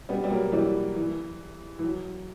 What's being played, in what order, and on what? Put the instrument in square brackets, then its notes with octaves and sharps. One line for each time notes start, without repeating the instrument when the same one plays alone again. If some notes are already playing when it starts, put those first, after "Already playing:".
[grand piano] G3 B3
G3
F#3 A#3
E3 G3
E3
E3
F#3